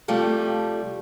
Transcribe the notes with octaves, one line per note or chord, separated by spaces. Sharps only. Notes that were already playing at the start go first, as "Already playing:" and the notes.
C3 F3 G3 A3